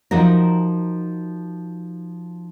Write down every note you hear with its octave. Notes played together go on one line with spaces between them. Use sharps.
F3 D#4 F#4 A#4